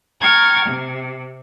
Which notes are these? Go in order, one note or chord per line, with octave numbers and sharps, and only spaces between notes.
G5 A#5 C#6 F6 G#6 A6
C3